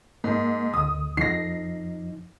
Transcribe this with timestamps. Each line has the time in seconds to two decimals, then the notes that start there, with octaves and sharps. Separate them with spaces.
0.24 G#2 A#3
0.74 D2 D#6
1.17 F2 F3 D#4 A#6 C7